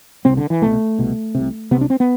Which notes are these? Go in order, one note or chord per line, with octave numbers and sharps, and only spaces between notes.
C2 C3 C4
D3
E3
C2 B2 A3
C2 B2
C2 C3
C2 C3 B3
D4
C4
B3